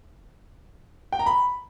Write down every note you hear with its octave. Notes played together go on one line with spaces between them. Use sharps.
G5
A#5
B5